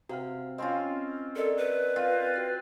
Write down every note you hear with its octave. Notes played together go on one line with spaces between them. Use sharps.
C3 F#4 F5 F6
C4 C#4 F4 D#5 C6
A4 A#4 D5 D#5
B4
C4 F4
F#4 F#6 A6